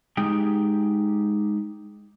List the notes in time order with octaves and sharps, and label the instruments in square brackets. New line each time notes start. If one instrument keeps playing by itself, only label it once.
[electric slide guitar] G#3 D#4 G4 G#4 G5